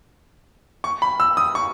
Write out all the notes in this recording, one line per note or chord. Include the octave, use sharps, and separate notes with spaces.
C#6
B5
E6
D#6
C#6